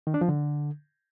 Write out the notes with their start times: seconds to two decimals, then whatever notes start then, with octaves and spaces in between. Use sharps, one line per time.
0.07 D#3
0.14 D4
0.21 F3
0.29 D3